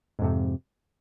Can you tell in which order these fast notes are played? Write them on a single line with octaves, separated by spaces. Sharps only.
G#2 F2 C3